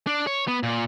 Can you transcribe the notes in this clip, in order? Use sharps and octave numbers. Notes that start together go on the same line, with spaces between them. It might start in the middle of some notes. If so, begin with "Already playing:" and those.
D4
C#5
B3
A#2